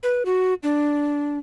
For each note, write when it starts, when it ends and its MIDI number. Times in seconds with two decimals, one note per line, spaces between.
0.03 0.23 71
0.25 0.54 66
0.63 1.38 62